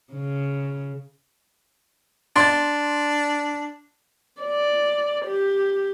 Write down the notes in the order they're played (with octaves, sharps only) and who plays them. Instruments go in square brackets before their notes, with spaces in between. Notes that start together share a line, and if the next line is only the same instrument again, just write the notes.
[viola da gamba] C#3
[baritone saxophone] D4 [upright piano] C6 A6
[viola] D5
G4